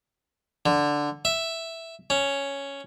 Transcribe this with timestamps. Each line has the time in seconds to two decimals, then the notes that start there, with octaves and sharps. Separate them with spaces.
0.66 D3
1.25 E5
2.10 C#4